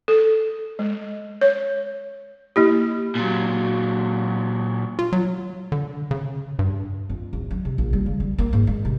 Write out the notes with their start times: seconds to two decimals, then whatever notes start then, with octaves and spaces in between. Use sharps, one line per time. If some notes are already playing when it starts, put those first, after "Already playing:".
0.08 A4
0.79 G#3
1.41 C#5
2.56 A#3 E4 G4
3.15 A#2 F#3
4.99 F4
5.13 F#3
5.72 D3
6.11 C#3
6.59 G2
7.09 F2
7.33 D1
7.51 F#3
7.65 C3
7.78 A#1
7.93 G3
8.06 C#3
8.20 G3
8.38 A#3
8.53 G#2
8.67 G#3
8.85 C3